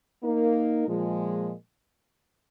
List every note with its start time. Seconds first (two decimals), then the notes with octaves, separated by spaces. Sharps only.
0.23 A#3 D#4 A#4
0.87 A#2 F3 G#3